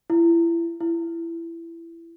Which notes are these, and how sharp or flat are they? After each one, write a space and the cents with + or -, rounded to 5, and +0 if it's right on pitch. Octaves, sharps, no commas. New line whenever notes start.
E4 +30
E4 +20